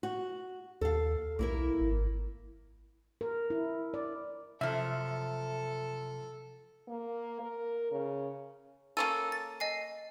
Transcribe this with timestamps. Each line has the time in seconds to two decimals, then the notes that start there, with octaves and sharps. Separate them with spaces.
0.03 F#4
0.81 D#2 A4 F5
1.39 B1 A#3 E4 A#4
1.81 G#1
3.21 A#4
3.50 E4
3.94 D5
4.61 F#2 C3 F3 A4 E5 F6
6.88 A#3
7.40 A#4
7.91 C#3
8.97 A#3 C#4 A4 D#7
9.32 A6
9.60 D#5 G#5 C7